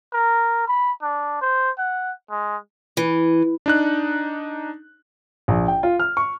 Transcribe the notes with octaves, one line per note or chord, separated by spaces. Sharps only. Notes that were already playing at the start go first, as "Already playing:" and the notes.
A#4
B5
D4
C5
F#5
G#3
E3
D4 D#4 F#6
A#1
G5
F4
F6
C#6